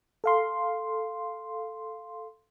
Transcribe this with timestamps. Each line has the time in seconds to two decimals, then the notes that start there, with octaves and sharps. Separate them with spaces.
0.24 A4 F5 C6